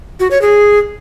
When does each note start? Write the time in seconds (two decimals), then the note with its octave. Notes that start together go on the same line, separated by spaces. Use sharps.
0.20 F#4
0.31 C#5
0.42 G#4